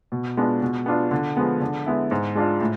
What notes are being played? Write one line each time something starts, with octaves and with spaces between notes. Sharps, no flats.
B2
G#3 B3 D4 F4
B2
B3 D4 F4
D3
F3 G#3 B3
D3
G#3 B3 E4
G#2
G#3 D4 F4
A2